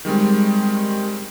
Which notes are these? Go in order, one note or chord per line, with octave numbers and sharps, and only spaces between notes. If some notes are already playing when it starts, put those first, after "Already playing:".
D#3 G3 G#3 C4